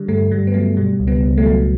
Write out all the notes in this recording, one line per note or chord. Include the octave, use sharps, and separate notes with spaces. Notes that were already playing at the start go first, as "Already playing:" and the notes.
Already playing: D3 G3
G2 A3
G2 G3
B3
F#3 A3
B2 G3
C#2
G3 B3
C#2
A3
F#3